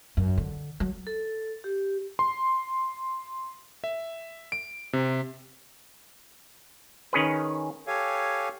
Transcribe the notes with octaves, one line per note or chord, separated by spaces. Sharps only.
F#2
D3
F#3
A4
G4
C6
E5
D7
C3
D#3 C#4 G#4 B4
G4 A4 C#5 F5 G#5